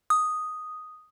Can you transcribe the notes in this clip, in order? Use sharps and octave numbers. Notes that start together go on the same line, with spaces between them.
D#6